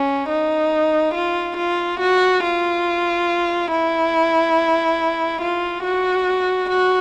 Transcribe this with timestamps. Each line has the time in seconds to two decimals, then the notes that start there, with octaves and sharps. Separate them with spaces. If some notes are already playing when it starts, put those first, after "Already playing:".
Already playing: C#4
0.29 D#4
1.14 F4
1.57 F4
2.00 F#4
2.43 F4
3.71 E4
5.42 F4
5.83 F#4
6.69 F#4